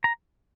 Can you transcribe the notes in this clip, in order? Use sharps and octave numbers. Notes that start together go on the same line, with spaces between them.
A#5